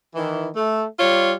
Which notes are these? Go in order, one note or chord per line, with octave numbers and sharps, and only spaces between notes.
D#3 E3
A3
G3 F4 C#5